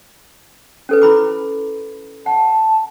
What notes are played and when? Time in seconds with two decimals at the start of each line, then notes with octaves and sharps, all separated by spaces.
0.89 C#4 A4 B4
1.02 E4 B5 D6
2.26 F#5 A5